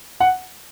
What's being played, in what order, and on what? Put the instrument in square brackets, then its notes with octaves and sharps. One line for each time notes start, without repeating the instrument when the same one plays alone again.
[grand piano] F#5